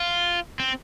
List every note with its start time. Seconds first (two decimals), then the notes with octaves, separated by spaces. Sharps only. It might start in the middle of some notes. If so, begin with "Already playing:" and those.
Already playing: F4
0.60 C4